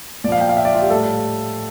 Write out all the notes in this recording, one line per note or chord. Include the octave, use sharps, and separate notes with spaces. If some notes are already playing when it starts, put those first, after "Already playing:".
A#2 F3 D5 F5
G5
F5
E5
D5
F4
G4
A2 G3 A4